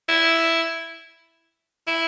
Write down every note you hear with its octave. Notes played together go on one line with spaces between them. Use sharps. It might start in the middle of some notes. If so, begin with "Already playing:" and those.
E4
E4